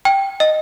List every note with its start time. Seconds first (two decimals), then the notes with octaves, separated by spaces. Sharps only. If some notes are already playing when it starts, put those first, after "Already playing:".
0.05 G5
0.40 D#5